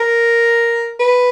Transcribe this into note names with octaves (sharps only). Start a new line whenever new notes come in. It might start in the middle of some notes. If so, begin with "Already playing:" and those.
Already playing: A#4
B4